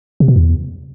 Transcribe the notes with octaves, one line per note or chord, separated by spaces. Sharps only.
C3
B2
E2